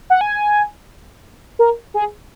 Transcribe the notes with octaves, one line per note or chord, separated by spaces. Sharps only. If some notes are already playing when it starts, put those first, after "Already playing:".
F#5
G#5
A#4
G#4